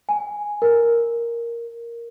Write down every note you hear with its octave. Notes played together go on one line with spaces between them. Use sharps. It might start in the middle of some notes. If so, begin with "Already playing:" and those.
G#5
A#4